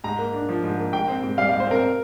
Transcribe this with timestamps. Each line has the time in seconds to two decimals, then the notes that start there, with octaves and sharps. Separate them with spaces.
0.04 G#2 A#5
0.19 A#3
0.34 D4
0.49 F3
0.64 G#2
0.78 A#3
0.93 G#2 G5
1.08 C4
1.23 G#2
1.38 G3 F5
1.49 G#2 F5
1.60 C5
1.67 C4 A#4